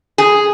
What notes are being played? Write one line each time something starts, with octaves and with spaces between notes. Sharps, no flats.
G#4